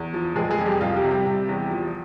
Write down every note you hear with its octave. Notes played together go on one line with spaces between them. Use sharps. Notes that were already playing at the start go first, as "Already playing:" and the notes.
Already playing: E2
F3
F1 G#3 G#4
G#3 G#4
F2
G3 G4
C2 F4
G3 G4
C3
G3 G4
C3
E2
F3